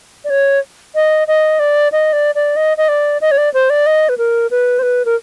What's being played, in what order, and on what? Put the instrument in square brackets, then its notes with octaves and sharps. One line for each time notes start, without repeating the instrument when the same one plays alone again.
[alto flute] D5
C#5
D#5
D#5
D5
D#5
D5
D5
D#5
D#5
D5
D#5
C#5
D5
C5
D5
D#5
B4
A#4
B4
C5
B4
A#4